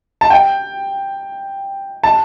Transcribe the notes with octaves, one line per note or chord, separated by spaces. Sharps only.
A5
G5
A5